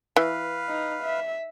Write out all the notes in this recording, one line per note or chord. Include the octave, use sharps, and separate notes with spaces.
E3 B4 F5
D#4
E5